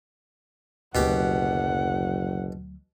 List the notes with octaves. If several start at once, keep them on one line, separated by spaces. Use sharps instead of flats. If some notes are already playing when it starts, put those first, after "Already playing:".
F#1 D2 B2 F#3 G4 F#5 D6